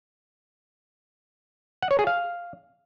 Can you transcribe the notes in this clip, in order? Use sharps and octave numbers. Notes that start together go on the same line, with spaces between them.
F#5
C#5
G#4
F5